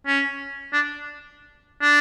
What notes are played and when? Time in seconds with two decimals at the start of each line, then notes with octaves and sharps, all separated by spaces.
0.07 C#4
0.73 D4
1.82 D4